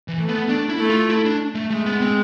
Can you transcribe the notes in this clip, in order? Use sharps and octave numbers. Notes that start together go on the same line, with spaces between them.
E3
A3
B3
D4
E4
A3
F4
E4
D4
A3
G#3 A3
B3
C4